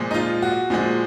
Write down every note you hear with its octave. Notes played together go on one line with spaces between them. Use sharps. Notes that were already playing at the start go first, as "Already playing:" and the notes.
Already playing: A#2 F3 G#3
D#4
F4
F#4
A#2 F3 G#3